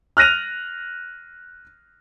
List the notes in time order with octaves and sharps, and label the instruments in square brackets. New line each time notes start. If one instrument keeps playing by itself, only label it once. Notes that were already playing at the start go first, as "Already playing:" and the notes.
[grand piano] F6 F#6 A#6 D#7 F7